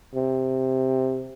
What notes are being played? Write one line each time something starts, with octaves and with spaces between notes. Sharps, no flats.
C3